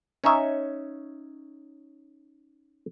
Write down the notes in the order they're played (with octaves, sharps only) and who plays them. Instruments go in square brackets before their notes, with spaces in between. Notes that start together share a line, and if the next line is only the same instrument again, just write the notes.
[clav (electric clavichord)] C#4 D#4 C#5 E5